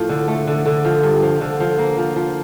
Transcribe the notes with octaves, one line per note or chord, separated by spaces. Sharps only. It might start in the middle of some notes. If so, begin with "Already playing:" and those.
Already playing: A2 F3
D3
A3
D3
D3
F3
G2
F3
D3
F3
A#3
F3
F3